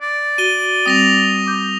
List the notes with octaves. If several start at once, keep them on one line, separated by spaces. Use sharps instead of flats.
D5
F#4 D#7 G7
G3 C4 D#6 A#6 F7
D6 G6